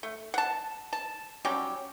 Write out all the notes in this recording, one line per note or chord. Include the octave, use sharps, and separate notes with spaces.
A3
F#5 A5
A5
F#3 G3 C#4 G4